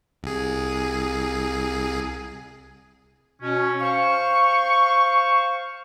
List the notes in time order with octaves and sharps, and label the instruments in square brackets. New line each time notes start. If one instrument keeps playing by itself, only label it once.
[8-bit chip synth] C2 G#4
[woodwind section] B2 C#4
C5 F5 C#6